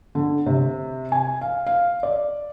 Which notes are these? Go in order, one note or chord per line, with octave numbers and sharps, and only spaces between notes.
D3
C3
G#5
F5
F5
D5